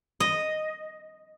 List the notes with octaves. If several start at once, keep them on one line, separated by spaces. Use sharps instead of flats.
D#5